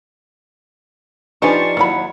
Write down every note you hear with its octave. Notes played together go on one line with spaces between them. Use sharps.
F3 D4 D#4 G4 B4 C5 G#5 C#6
D#2 D#3 F#3 E4 B5